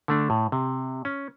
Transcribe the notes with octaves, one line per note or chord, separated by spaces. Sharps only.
D3 A3 D4
A2
C3
C#4